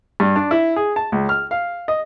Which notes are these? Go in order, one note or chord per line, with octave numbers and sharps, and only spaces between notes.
G2
D4
E4
G#4
A5
C#2
F6
F5
D#5